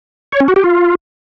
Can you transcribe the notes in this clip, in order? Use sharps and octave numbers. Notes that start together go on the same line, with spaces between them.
C#5
C#4
F#4
G4
F4